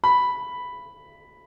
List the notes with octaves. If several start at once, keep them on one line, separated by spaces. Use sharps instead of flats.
B5